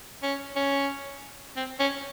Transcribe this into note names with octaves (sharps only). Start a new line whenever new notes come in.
C#4
C#4
C4
C#4